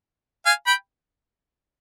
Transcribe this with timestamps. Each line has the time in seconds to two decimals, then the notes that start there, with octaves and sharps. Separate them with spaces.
0.46 F5 G#5
0.67 G5 B5